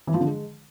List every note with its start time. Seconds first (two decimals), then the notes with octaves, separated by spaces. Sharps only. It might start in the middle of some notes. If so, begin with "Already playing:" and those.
0.07 E3
0.14 F3
0.20 D3
0.27 G#3